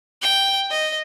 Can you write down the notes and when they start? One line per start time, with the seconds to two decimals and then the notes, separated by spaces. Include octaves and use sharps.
0.22 G5
0.71 D#5